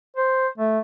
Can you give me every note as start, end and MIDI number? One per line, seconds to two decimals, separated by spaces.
0.17 0.48 72
0.58 0.79 57